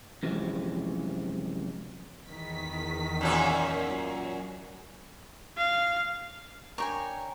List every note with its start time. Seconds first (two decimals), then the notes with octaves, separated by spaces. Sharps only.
0.23 F#2 C3 E3 F3 G3 G#3
2.29 E2 D#3 B6
3.21 F#2 A#2 C#4
3.88 F#3
5.57 F5
6.78 D4 A#4 C#5 G5 G#5 A#5